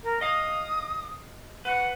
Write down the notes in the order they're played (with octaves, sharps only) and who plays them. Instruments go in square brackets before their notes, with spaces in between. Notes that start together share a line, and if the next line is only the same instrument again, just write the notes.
[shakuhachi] A#4
[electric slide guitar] D#5 F5 [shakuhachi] D#6
[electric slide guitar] B4 [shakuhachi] F#5